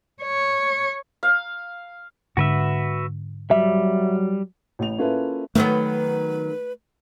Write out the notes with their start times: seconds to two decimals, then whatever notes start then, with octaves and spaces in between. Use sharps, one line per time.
0.23 C#5
1.23 F5
2.37 G#2 D3 F#4 B4 E5
3.51 F#3 G3 E5
4.79 A1 A2 F7
4.98 A#3 C#4 E4 F4 A4 B4
5.55 D#3 F#3 A3 B3 B4